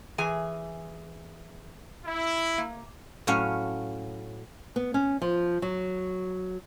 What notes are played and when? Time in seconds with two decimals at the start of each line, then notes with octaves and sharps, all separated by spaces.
0.18 E3 G#4 G#5
2.05 E4
2.58 A#3
3.27 A2 F#3 C#4 F5
4.76 B3
4.94 C#4
5.22 F3
5.62 F#3